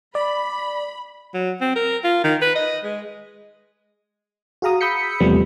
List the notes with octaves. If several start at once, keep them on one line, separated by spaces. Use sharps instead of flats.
D5 B5
F#3
C4
A#4
F4
D#3
B4
D#5
G#3
F#4 G#4 F5 A#5 D#6
B5 D#6 E6 G6 B6 C#7
E2 C3 F3 G3 A3 B3